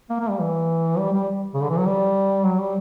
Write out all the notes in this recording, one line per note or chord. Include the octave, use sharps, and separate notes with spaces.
A#3
A#3
G3
E3
G3
G3
C#3
D3
E3
F#3
G3
F#3
G3